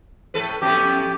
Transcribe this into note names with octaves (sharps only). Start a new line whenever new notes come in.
A2 A4 B4
F2 A2 B3 G4